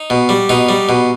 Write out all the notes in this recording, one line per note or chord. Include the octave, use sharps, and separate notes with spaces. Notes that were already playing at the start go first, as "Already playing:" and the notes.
Already playing: D#4
B2
G3
B2 D#4
G3
B2